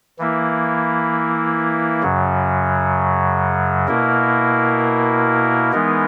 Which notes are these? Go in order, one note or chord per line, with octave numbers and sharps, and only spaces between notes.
E3 A#3 E4
F#2 C#3 F#3
B2 A#3 E4 A#4
E3 G#3 B3 D#4 A#4